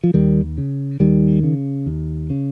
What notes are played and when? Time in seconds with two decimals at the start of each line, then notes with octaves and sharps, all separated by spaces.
0.04 F3
0.14 D#2 D#3 G3
0.58 C#3
1.00 D#2 D#3 G3
1.43 C#3
1.86 D#2
2.30 C#3